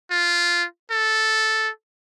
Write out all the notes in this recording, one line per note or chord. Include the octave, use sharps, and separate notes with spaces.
F4
A4